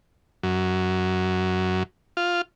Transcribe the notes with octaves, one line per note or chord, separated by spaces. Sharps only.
F#2
F4